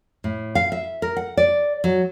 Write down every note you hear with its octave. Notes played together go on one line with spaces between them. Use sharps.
A2
F5
E5
A#4
F#5
D5
F#3